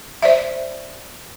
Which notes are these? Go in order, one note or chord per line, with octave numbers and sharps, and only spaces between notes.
C5 D5 E5